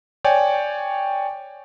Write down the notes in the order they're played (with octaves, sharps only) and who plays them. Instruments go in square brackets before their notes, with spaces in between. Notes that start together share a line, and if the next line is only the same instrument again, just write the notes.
[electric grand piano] C#5 D5 G5 G#5